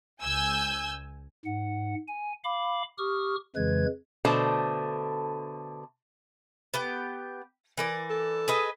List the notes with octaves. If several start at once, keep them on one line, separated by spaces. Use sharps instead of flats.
C#2 G#5 E6 G6
G#2 F#5
G#5
F5 B5 D6
G4 C#6 D#6 F6
F2 C#3 E3 G#3 B4 G#6
B2 D3 A3 C5 A5
B3 G4 G5
E3 A#4 D5
A4
G#4 B4 D#5